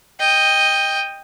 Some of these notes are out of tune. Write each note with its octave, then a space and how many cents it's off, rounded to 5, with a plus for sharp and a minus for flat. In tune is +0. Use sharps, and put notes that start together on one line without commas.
D#5 +0 G5 +15